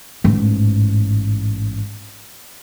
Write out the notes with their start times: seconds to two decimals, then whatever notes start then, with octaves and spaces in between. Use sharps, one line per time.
0.24 A1 G#2